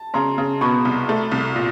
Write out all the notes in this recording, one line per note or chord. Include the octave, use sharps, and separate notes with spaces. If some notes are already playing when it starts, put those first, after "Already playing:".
Already playing: A5
C#3 A#5 C6
C#3
B2 B5 C#6
C2
A3
C2
A#2